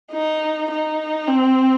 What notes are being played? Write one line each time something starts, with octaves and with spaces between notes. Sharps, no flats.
D#4
D#4
C4